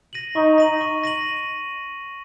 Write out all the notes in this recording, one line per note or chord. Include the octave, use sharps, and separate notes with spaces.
A#6 D#7 F#7
D#4 C#6
A#6 D#7 F#7
C#6
A#6 D#7 F#7